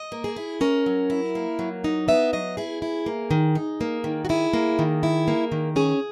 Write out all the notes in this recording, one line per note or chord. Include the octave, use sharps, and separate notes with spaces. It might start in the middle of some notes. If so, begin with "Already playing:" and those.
Already playing: D#5
A#3
G#4
E4
C#4 A#4
F#3
E4
A#3
F#3
D#4
B3 E5
F#3 D#5
E4 G#4
E4
A#3
D#3
D#4
A#3
D#3
F#4
E4 G#4
A#3
D#3
E4
A#3
D#3
C#4 G#4